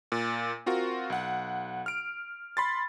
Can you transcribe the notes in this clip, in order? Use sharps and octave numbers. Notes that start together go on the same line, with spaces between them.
A#2
C4 F4 F#4 A#4
B1 F#5
F6 D7
B5 C6 A6